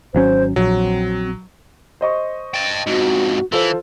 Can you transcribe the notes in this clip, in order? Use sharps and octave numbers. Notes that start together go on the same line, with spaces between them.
G#1 F#3 C#4 C5
A#1 F#3 C4
C5 D#5 C#6
G5 A5
F2 G#2 F#4
E3 F4 A4 C5